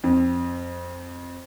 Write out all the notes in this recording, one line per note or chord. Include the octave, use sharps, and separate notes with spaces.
F2